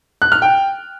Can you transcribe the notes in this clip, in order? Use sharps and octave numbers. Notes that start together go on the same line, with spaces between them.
F#6
F6
G5